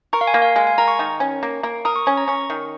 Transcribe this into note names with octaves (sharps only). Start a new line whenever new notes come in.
A#4 C#6
F5
G#5
A#3
F5
G#3 F5
G#5
A#4 A#5
C#6
D#3
C#4
A#3
A#3
A#4 D#6
C#6
C#4 C#6
A#5
C#4 C#6
D#3